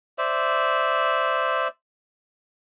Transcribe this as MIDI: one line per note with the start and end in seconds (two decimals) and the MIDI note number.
0.18 1.68 72
0.18 1.68 74
0.18 1.68 76